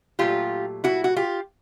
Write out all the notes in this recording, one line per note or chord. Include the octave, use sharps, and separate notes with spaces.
A#2 F#3 A3 F4 G4
E4 F#4
F#4
F4 G4